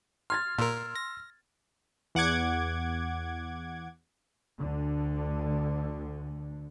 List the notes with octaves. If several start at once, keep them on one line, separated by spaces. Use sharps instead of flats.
C6 F6 G#6 A6
A#2 A#4 C6 E6
A#6
E2 F#5 D6 G#6
D2 D3